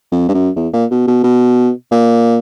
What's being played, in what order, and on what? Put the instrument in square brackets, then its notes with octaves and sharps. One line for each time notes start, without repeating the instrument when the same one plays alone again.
[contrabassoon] F2
G2
F#2
E2
A#2
B2
B2
B2
A#2